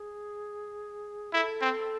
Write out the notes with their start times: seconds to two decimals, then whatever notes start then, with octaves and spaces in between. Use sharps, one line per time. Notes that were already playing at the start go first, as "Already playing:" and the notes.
Already playing: G#4
1.33 E4 A4
1.61 C4